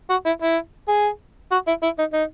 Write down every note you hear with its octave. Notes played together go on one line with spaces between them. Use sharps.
F#4
E4
E4
G#4
F#4
E4
E4
D#4
D#4